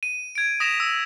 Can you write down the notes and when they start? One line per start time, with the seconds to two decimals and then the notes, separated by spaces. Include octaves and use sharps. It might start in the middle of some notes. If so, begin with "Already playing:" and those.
0.03 D#7
0.35 G#6 D7
0.60 D#6 A#6 B6 E7 F7
0.80 D#6 E6